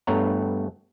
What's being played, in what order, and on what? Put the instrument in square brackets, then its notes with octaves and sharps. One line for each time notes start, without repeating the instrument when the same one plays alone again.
[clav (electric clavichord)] G2 A3 B3 C#5 A#5